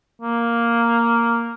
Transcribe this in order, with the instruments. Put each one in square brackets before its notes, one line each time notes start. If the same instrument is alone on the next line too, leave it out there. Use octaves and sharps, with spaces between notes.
[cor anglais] A#3